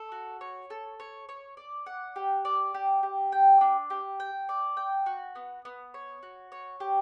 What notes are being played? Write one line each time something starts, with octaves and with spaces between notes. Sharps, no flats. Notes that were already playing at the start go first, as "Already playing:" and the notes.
Already playing: A4
F#4
C#5
A4
C#5
C#5
D5
F#5
G4
D5
G4
G4
G5
D4
G4
G5
D5
G5
F#4
B3
B3
C#5
F#4
C#5
G4